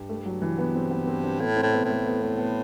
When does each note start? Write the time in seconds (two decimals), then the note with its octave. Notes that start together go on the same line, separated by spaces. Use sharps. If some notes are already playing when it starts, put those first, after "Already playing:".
Already playing: G2
0.09 A3
0.26 F#3
0.42 E3
0.59 B3
0.75 C4
0.91 B3
1.07 C4
1.24 C4
1.40 A2 B3
1.57 C4
1.63 A2
1.73 B3
1.84 A2
1.90 A3
2.06 B3
2.22 B3
2.38 B3